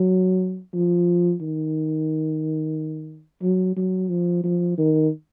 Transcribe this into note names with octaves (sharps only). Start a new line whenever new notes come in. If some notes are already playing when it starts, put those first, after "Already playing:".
Already playing: F#3
F3
D#3
F#3
F#3
F3
F3
D#3